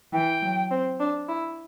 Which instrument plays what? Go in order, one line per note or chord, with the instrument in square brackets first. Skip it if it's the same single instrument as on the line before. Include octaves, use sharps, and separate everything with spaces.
[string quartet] E3 [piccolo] G5
[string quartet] F#3
C4
D4
E4